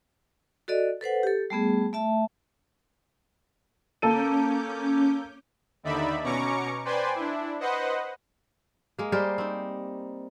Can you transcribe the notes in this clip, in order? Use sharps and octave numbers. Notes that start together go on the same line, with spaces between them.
F#4 A4 D5 D#5
A4 B4 C5 F#5
G4 A4
G3 A3 B3 G#4
A3 E5 A5
A#3 C#4 A4 D6 G6 D#7
D#2 D3 D#4 D5 E5 B5
B2 C#4 A#5 C#6 D6 C#7
B4 C5 D5 G5 G#5 C6
D4 E4
B4 C5 D#5 F#5
G#3 A#3
G3 G#4 A#4 C5
C4 D#4